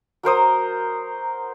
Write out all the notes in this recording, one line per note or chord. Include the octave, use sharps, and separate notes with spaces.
F#3 A#4 C5 D#6